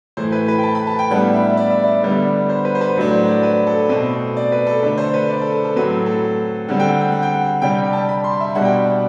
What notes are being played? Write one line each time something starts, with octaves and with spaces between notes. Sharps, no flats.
A2 E3 A3 C5
B4
B4
G5
A5
B5
A5
G5
A2 G3 B3 D4 F#5
E5
D5
E5
D5
D3 G3 B3 D4
C5
B4
C5
B4
A2 F#3 A3 D4 C5
C5
D5
B4
A4
B2 A3 C4 B4
D5
B4
A4
D3 A3 D4 B4
C5
B4
D5
A4
A4
A4
A2 F#3 C4 B4
A4
A4
D3 G3 C4 F#5
G5
F#5
G5
F#5
G5
F#5
C3 G3 D4 G5
G5
A5
B5
C6
E5
B2 G3 D4 F#5
G5
F#5